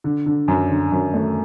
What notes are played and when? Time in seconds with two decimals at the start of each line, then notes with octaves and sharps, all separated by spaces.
0.04 D3
0.26 D3
0.48 F#2
0.70 D3
0.92 F#2
1.14 A3